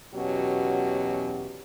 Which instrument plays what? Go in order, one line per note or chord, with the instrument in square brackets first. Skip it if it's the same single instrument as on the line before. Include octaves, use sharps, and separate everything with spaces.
[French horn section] E2 B2 F#3 C#4 G4